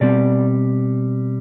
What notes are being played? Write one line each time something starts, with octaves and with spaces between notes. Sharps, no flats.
B2 G3 C4 D5